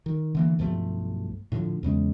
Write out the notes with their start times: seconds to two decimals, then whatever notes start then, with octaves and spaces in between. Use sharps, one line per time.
0.06 D#3
0.35 D3 E3 A#3
0.59 B1 G2 F3 A3
1.52 A2 D3 F3
1.83 E2 C#3 G#3